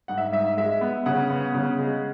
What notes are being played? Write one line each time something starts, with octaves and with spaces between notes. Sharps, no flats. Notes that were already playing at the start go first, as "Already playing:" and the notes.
G#2 F#5
E5
G#2 E5
G#3 E5
B3
C#3 F#5
B3
C#3
G#3